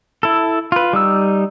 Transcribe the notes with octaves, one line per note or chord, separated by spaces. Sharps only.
E4 A4
F4 B4
G3 D#4 E6